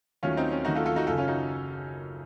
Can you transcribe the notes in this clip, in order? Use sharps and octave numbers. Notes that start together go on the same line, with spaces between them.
D#2 D#3 F#3 A3 C#4 F4
C4 D#4
C#4
D#2 D#3 F#3 A3 D#4 F#4
F4 A4
F4 A4
D#4 F#4
F#1 F#2 C#3 F4 A4
C#4 F4
D#4 F#4